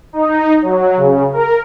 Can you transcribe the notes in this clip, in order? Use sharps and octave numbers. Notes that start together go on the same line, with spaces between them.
D#4
F#3
C#3
A#4